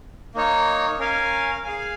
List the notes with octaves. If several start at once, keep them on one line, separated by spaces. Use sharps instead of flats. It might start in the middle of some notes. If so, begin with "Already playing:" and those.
A#3 D#4 C#5
C#4 A#4 F5 G#5
G#4 F5 G#5